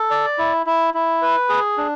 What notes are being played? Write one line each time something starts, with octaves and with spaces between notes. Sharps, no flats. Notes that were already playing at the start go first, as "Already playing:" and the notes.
Already playing: A4
D5
E4
E4
E4
B4
G#4
D4